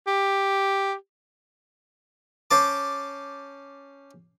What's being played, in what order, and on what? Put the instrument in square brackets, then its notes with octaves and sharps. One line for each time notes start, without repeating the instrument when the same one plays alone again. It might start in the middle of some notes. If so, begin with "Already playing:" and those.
[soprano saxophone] G4
[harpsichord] C#4 C5 A5 D6